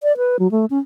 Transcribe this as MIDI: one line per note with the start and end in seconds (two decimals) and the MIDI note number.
0.03 0.16 74
0.17 0.37 71
0.39 0.50 54
0.51 0.66 57
0.70 0.79 61